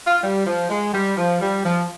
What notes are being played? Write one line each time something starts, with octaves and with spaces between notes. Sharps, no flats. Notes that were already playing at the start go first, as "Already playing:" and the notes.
F4
G3
F3
G#3
G3
F3
G3
F3